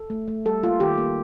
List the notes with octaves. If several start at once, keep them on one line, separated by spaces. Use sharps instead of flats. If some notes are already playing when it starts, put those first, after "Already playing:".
Already playing: A4
A3
A3
G3 A4
A#3 F4
D#3 G4
A#3